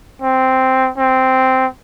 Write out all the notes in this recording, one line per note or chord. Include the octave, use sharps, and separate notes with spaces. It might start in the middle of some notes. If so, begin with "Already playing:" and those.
C4
C4